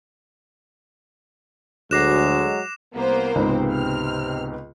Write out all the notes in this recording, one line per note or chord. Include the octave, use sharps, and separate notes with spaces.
D2 F#3 G#3 D6 F#6 A#6 C7 E7
C2 A#3 B3 C5
C#2 G#2 C3 B3 C4
F6